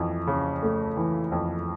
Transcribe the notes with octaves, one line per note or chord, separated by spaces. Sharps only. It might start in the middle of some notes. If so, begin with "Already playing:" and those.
Already playing: F2 E3
C#3
A3
E3
F2